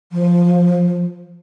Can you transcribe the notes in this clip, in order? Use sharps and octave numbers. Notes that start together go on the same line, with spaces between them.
F3